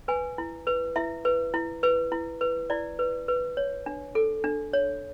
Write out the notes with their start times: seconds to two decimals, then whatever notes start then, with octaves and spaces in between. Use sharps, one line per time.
0.08 B4 G#5
0.38 E4
0.67 B4
0.96 E4 E5
1.25 B4
1.54 E4
1.83 B4
2.12 E4
2.41 B4
2.70 E4 D5
2.99 B4
3.28 B4
3.57 C#5
3.86 D4
4.15 A4
4.44 D4
4.73 C#5